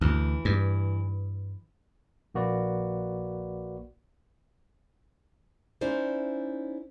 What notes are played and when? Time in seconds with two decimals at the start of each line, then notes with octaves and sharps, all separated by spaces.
0.01 D2 E3
0.45 G2
2.35 A#1 A#3 F#4 B4 D5
5.81 C#4 D#4 E4 C5 D5